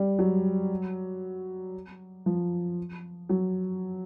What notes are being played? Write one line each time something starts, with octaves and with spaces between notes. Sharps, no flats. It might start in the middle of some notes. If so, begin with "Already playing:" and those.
Already playing: G3
F#3
F3
F#3